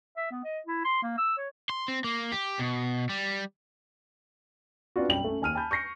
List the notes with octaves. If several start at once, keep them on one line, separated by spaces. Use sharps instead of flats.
E5
B3
D#5
E4
C6
A#3
E6
C#5
C6
C4
A#3
G4
B2
G3
B3 C4 D4 F4 F#4
B1 F#2 G3 G5 F#7
A3 C#4
D#2 G#5 F6 D#7
G#5 A5 B5 G6
C#6 G6 A#6 C7 C#7